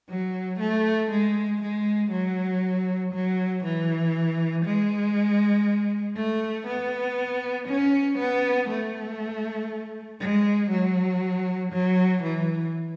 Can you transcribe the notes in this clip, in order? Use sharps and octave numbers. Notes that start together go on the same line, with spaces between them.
F#3
A3
G#3
G#3
F#3
F#3
E3
G#3
A3
B3
C#4
B3
A3
G#3
F#3
F#3
E3